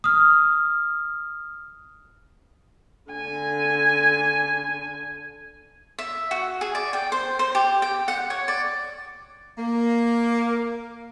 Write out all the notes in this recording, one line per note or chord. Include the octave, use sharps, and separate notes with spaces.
D#6 F6
D3 G#5
E5
F#4
G#4
D5
G5
C5
C5
G4
G5
F#5
C#5
D5
A#3